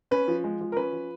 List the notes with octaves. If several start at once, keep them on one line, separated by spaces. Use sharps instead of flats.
C#4 B4
F3
G#3
F3
A#4
C#4 B4
F3